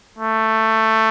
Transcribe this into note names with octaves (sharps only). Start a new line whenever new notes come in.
A3